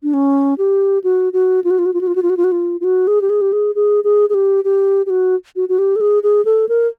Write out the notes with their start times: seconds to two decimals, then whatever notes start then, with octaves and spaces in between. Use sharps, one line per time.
0.03 D4
0.14 C#4
0.58 G4
1.04 F#4
1.33 F#4
1.64 F4
1.70 F#4
1.79 F4
1.86 F#4
1.94 F4
2.01 F#4
2.07 F4
2.15 F#4
2.22 F4
2.30 F#4
2.37 F4
2.44 F#4
2.52 F4
2.81 F4
2.84 F#4
3.07 G#4
3.22 G4
3.30 G#4
3.41 G4
3.53 G#4
3.75 G#4
4.04 G#4
4.29 G#4
4.34 G4
4.64 G4
5.06 G4
5.10 F#4
5.56 F#4
5.69 F#4
5.78 G4
5.96 A4
6.01 G#4
6.23 G#4
6.45 A4
6.69 A#4